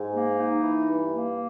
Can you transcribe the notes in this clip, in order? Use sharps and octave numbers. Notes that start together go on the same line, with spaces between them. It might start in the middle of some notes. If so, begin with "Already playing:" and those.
Already playing: G#2
A#3
D#4
E3
G2
A#3